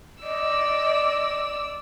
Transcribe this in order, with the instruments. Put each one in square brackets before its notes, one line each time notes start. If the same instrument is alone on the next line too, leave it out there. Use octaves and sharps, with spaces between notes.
[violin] D5 E6 [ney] D#5